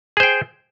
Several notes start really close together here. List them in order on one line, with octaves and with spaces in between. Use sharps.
G#4 C5 G5